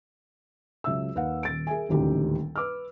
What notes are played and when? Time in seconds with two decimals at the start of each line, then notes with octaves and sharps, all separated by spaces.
0.84 C#2 F#3 E5 E6
1.15 D#2 B4 F5 F#5
1.43 D#1 A6 D7
1.67 G#4 A#4 E5 G#5
1.89 D#1 A1 D2 D#4 G4 G5
2.56 B4 D6 E6 F6